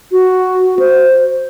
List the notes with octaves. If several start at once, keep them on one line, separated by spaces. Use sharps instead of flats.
F#4
C5